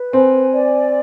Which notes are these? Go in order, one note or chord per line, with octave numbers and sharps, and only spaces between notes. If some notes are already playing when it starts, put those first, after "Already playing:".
Already playing: B4
C4 G#5
D5